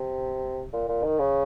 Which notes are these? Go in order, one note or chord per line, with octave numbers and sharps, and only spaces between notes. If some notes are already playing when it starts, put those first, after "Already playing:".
Already playing: C3
A#2
A#2
D#3
C#3